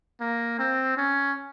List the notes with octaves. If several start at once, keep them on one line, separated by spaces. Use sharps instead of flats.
A#3
C4
C#4